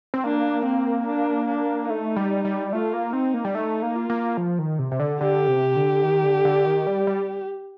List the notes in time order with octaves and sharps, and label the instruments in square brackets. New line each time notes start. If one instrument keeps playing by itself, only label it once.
[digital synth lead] C4
[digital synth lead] A#3 [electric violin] D4
[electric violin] C4
D4
D4
[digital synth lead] A3 [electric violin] D#4
[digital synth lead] G3
G3
[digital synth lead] A3 [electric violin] F4
[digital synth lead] A#3
[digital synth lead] C4 [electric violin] D#4
[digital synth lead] A#3
G3
[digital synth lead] A3 [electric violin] D#4
[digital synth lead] A#3
[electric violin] F4
[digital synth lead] A#3
F3
D#3
C3
C3
D3
[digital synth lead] D3 [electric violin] G4
[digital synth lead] C3
D3
D#3
D3
D3
D#3
G3
G3